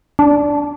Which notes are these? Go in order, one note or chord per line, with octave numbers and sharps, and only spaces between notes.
D4